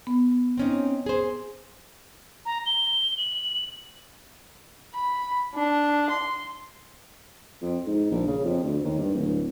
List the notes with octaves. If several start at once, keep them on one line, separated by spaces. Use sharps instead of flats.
B3
C4 C#4 D#4
G#4 C5
A#5
G7
F#7
B5
D4
C6
F2
G#2
A#1
C#3
F2
D2
D#2
G2
D1